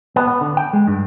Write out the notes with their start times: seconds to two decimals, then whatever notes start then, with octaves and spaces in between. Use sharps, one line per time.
0.16 B3
0.28 B3
0.41 D3
0.57 G5
0.73 G#3
0.88 G2